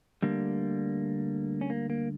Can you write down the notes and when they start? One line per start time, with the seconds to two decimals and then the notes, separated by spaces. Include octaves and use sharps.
0.22 D2 D3 G3 A#3
1.61 C#4
1.70 A#3
1.90 A#3